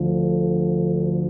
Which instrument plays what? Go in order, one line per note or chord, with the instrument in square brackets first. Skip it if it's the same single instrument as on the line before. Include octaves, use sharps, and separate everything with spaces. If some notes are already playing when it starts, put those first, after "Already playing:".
Already playing: [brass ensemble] D2 D3 F3